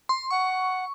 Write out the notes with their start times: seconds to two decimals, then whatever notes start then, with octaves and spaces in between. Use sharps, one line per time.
0.09 C6
0.31 F#5 C#6